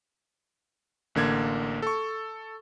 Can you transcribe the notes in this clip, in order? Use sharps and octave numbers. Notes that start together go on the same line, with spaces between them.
A1 D3 A#3 G#6
A4 C#6